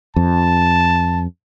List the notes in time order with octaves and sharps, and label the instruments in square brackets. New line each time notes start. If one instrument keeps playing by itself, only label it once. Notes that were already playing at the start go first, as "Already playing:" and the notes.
[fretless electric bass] F2 [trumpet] A5